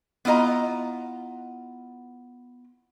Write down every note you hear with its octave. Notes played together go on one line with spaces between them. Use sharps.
B3 E4 F4 D#5 A#5